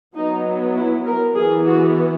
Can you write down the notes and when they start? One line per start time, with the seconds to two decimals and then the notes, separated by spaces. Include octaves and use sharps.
0.16 F#3 B3 D#4
0.76 E4
1.06 A#4
1.36 E3 B3 G#4
1.67 F#4